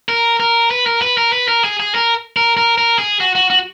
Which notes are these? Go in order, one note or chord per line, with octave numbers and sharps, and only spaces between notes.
A#4
A#4
B4
A#4
B4
A#4
B4
A#4
G#4
G#4
A#4
A#4
A#4
A#4
G#4
F#4
F#4
F#4